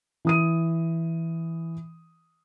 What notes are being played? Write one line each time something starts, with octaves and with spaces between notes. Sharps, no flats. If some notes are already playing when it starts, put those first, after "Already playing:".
E3 D#6 D#7